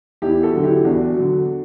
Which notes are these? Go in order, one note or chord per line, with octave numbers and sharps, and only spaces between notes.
E2 E4 G4
F#4 A4
D3 F#3
E4 G4
E2 D4 F#4
D3 F#3